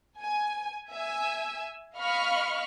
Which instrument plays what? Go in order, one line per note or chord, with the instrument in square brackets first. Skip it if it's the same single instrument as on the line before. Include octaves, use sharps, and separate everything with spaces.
[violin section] G#5
E5 G#5 E6
D#5 F5 B5 C#6 F6